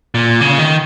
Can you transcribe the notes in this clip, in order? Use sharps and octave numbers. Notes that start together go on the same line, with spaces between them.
A#2
C#3
D#3